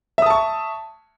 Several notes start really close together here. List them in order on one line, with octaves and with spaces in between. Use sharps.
E5 D#6 A5 C#6